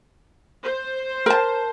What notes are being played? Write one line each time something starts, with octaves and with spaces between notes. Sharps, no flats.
C5
A#4 A5